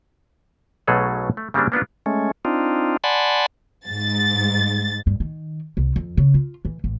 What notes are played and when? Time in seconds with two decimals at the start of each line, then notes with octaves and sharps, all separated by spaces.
0.87 B1 B2 F#3 A3 G#4 A4
1.37 A3
1.54 C#3 G3 A#3 C4 D4
1.72 A#3 B3 D4 F4
2.06 G#3 A3 C#4
2.45 C4 D4 D#4 F4
3.04 D5 F#5 G#5 A5 B5 C6
3.87 G#2 A6
5.07 G2
5.20 D#3
5.77 C2
5.96 F2
6.17 C#3
6.34 F4
6.65 E3
6.84 A1